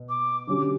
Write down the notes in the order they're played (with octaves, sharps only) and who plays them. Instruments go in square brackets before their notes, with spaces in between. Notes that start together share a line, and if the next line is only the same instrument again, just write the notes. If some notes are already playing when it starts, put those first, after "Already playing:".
Already playing: [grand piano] B2
[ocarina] D6
[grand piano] D3 F#3 C#4 G4 [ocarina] D6